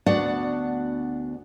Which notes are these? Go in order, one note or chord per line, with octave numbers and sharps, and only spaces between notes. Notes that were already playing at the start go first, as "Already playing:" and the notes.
D2 B3 D4 F#4 D5 F#5